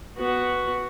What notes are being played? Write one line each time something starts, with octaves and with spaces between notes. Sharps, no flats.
B3 F#4